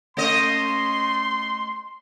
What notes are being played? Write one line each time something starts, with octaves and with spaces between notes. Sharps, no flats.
A3 C#4 D#5 C6